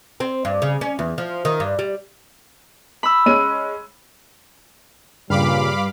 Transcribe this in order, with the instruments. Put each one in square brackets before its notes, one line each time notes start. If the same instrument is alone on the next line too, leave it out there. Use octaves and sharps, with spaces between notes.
[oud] C4
G2
C#3
C#4
E2
F3
D#3
G2
G3
[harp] B5 E6
[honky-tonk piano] G#3 C#4 D#7
[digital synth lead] G2 [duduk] A#2 [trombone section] C#3 G3 [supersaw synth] F5 B5 D6